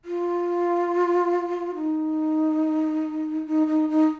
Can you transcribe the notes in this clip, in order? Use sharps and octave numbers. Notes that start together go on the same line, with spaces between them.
F4
D#4
D#4
D#4
D#4